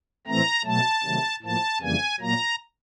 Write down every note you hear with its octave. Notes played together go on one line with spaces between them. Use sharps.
A2 E3 A3 C4 A#5
B2 F#3 A3 A5
C3 D#3 F#3 A3
A2 F3 A#3 A5
F2 C#3 E3 G3 A#3 G#5
A#2 F#3 A#3 A#5